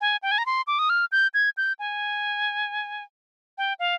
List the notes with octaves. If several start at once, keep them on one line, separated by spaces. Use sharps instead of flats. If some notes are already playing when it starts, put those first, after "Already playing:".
G#5
G5
G#5
A#5
C6
D6
D#6
F6
G6
G#6
G6
G#5
G5
F5